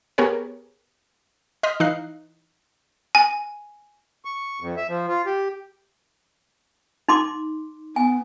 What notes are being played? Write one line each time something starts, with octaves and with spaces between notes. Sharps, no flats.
B3 G4 G#4 A#4 B4 C#5
D#5 C6 F6 G6 B6
E3 D#4 F5 F#6 C7
G#5
C#6
F2
E5
F3
F4
G4
D#4 C6 D6
B3 G#5